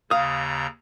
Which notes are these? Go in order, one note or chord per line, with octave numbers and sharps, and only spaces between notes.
D#2 C#3 F5 A#5 D#6